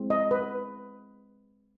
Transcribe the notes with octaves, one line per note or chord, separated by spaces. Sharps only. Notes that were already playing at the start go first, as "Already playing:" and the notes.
Already playing: G#3 C4 E4
D#5
B4